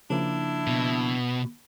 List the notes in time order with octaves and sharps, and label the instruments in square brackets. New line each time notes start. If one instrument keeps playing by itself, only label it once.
[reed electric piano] C#3 F3 A#3 [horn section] D4 E4
[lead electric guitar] B2